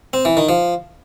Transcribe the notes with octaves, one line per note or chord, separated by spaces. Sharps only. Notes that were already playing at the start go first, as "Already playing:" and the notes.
C4
E3
D#3
F3